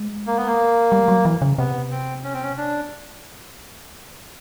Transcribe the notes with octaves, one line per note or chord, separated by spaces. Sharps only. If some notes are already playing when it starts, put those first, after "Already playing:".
Already playing: G#3
A#3
B3
A#3
G3
F#3
E3
C#3
C3 B3
C4
C#4
C4
C#4
D4